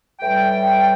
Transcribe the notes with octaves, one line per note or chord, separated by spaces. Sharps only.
A2 E3 G3 G5